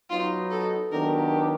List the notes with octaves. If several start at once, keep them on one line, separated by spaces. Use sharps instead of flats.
F#3 B3 D#4 F4
A4
D#3 F#3 B3 D4 G4 A#4